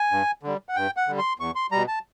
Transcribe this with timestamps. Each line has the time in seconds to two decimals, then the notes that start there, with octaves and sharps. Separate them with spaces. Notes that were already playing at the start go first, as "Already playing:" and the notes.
Already playing: G#5
0.11 G2
0.43 D3 G3
0.69 F#5
0.76 G2 G5
0.96 F#5
1.08 D3 G3
1.18 C6
1.39 E2 C#6
1.55 C6
1.72 B2 G3 A#5
1.88 A5